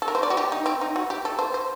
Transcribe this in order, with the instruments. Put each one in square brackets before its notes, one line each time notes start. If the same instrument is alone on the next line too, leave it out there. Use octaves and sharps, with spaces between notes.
[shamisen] A4
A#4
C5
D5
F#4
G4
D#4
C4
D#4
F#4
G4
A4
C5
C5